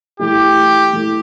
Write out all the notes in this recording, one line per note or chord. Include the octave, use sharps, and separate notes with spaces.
E3 A3 E4 G4
E3 A3 E4